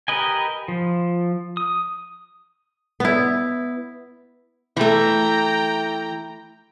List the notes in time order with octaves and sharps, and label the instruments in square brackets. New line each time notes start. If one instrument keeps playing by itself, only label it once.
[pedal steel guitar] G4 A#4 B4 D#5 G#5
F3
D#6
[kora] B3 E4
[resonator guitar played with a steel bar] E3 A3 [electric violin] G5 A#5